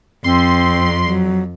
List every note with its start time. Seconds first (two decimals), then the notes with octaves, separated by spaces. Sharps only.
0.24 F2 C4 C6
1.07 F#3